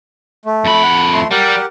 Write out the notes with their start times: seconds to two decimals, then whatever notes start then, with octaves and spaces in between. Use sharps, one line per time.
0.46 A3
0.65 F2 B5
0.83 F#5
1.13 A3 C6
1.31 G3 G4 A#4 F#5